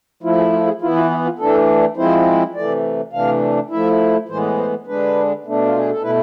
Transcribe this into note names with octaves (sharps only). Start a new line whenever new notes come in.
F3 A3 E4 F4
G#4
F4
G#4
E3 B3 E4 F4
F4
E4
F4
E3 A3 D4 A4
F3 G#3 C4 E4 C5
C3 E3 A3 D5
C3 E3 A3 D4 F5
F3 A3 E4 E5
A2 E3 G#3 B3 C5
C5
D3 G#3 D4 B4
B2 A3 D4
F4
G#4
A4
B2 A3 E4 B4